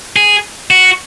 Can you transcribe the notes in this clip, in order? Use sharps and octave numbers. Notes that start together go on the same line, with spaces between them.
G#4
F#4